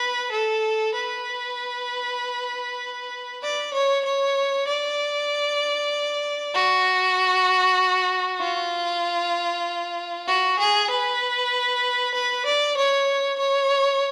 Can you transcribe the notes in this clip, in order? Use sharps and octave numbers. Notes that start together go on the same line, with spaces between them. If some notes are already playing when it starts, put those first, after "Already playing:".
Already playing: B4
A4
B4
D5
C#5
C#5
D5
F#4
F4
F#4
G#4
B4
B4
D5
C#5
C#5